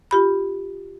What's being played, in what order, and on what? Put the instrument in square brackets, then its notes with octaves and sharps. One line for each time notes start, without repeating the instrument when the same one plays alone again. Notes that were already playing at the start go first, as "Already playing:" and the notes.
[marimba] F4 G4 B5